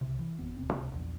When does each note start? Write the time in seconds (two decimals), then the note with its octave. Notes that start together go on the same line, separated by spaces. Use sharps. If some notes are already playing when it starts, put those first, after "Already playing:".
0.01 C2 C3
0.19 E3
0.39 G#1 F2 B3
0.57 D#1 C2 C4
0.74 C#2 C3
0.92 A#1 E2